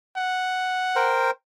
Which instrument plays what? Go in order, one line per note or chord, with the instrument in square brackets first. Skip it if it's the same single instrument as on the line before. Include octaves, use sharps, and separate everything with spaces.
[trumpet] F#5
[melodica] A#4 C5 G5